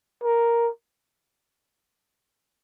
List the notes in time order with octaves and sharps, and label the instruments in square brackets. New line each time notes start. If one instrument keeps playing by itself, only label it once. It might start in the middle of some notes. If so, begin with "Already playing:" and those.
[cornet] A#4